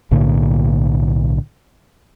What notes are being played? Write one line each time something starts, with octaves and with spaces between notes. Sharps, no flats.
B1 A2 D3 A#3